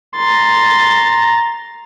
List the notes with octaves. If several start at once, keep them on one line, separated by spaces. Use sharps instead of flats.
A#5 C6 A6